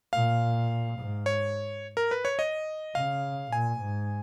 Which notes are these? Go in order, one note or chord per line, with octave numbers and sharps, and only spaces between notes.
A#2 F5
G#2
C#5
A#4
B4
C#5
D#5
C#3 F5
A#2 G#5
G#2